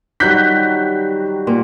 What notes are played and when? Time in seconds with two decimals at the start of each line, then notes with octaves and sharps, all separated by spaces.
0.20 D#3 F#3 G3 F#6 G6 B6
1.47 A#2